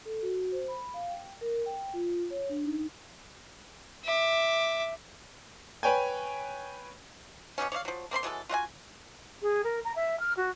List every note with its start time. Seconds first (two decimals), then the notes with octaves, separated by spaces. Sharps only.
0.05 A4
0.22 F#4
0.52 C5
0.68 B5
0.94 F5
1.08 G5
1.41 A#4
1.66 G5
1.93 F4
2.30 C#5
2.49 D4
2.64 D#4
4.04 E5 D6
5.83 B4 C#5 G5 G#5
7.58 B2 G3 B3 C#4
7.72 C#5 D5 E5 F5
7.85 F3 F#3
8.11 A#3 C4 B5 C6
8.23 E3 F#3 G#3 A4
8.49 F4 F#4 D#5 G#5
9.42 G#4
9.64 A#4
9.84 A#5
9.96 E5
10.20 F6
10.37 F#4